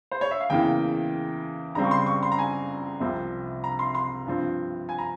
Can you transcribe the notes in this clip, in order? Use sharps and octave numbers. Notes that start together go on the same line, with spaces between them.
C5
C#5
E5
F5
E2 C#3 E3 A#3 G5
C#2 C#3 G3 C4 A#5
C#6
C6
C#6
C6
A#5
G#5
C2 C3 F3 C4
A#5
C6
C6
G2 F3 C4
G#5
A#5